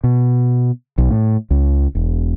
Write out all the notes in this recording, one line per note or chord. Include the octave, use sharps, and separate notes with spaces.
B2
B1
A2
C#2
E1